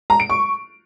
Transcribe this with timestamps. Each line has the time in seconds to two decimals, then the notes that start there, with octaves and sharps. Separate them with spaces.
0.10 A#5
0.20 D7
0.30 C#6